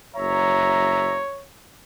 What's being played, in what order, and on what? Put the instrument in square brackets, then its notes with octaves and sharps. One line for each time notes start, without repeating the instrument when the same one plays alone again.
[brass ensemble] F#1 E5 A#5 [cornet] C#5